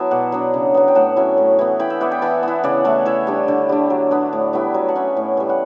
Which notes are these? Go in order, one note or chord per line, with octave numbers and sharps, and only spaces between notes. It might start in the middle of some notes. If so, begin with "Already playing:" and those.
Already playing: F#3 B3 E4 A5
B2 D5 F#5
F#3 B3 D4
C#3
F#3 B3
G5
A2 F#5 A5
F#3 C#4 E4
A2
E3 B3
E3 G5 B5
E5 G5
B3 E4 D5 F#5
G5 B5
E3 F#5 A5
B3 E4
C#3 D5 F#5
E3 A3
E3 C#5 E5
G3 D4
D3
G3 D4
F#3
B3 D4
A2
G3 B3 E4
F#3
F#5 A5
C#4 E4
A2
E3 G3
F#5